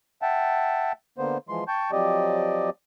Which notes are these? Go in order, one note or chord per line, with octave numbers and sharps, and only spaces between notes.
E5 F#5 G5 A5
D3 A#3 B3 C5
E3 F3 G#3 C6
G5 A5 C#6 G6
F3 F#3 C4 G4 D5 D#5